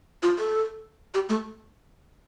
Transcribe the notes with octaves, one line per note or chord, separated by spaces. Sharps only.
F4
A4
G4
A3